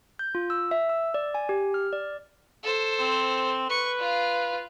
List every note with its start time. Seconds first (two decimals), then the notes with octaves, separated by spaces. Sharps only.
0.19 G6
0.35 F4
0.50 E6
0.71 E5
0.89 E6
1.14 D5
1.35 G#5
1.49 G4
1.74 F6
1.93 D5
2.63 A4 C5
3.00 C4
3.70 B4 C#6
3.99 F4 F5